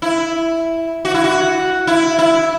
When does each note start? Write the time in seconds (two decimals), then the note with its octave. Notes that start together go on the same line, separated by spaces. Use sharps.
0.02 E4
1.05 F#4
1.14 E4
1.24 F#4
1.87 E4
2.19 E4